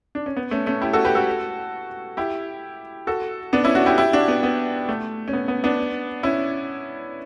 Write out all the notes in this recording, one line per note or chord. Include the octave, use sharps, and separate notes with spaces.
D4
C#4
B3
A3 C#4
A3 C#4
E4 G4
F#4 A4
G4 B4
F#4 A4
E4 G4
F#4 A4
B3 D4
C#4 E4
D4 F#4
E4 G4
E4 G4
D4 F#4
B3
B3
A3
C#4
B3
B3
B3 D4
C#4 E4